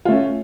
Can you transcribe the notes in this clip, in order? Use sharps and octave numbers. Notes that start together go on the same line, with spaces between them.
A3 C#4 F4